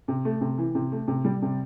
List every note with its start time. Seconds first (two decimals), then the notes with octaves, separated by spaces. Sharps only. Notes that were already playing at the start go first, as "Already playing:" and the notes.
0.08 C3
0.25 A3
0.41 C3
0.58 E3
0.75 C3
0.92 A3
1.08 C3
1.25 G3
1.42 C3